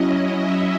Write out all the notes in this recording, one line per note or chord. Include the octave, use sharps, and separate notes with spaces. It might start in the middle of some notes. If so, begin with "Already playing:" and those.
Already playing: F#3 C#4 E4 D#5
E5